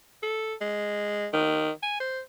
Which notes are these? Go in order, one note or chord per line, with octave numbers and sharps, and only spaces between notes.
A4
G#3
D#3
G#5
C5